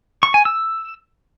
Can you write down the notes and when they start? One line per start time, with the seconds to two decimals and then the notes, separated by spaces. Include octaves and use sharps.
0.23 C#6
0.34 G#5
0.45 E6